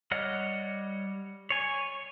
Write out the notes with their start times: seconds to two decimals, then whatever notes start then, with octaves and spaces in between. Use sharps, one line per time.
0.11 G3 C#5 D#5 F#5 F6
1.50 C#5 G#5